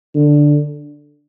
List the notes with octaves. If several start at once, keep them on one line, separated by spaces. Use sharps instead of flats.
D3